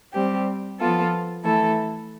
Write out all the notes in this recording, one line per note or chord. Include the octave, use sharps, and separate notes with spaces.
G3 C4 G4
F3 B3 F4 A4
E3 A3 E4 A4